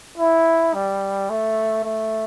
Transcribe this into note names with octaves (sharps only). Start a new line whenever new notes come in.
E4
G3
A3
A3